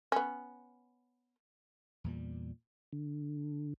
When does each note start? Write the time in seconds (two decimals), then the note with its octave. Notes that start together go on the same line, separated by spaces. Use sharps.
0.12 B3 C#4
2.04 E2 A#2 G3
2.93 D3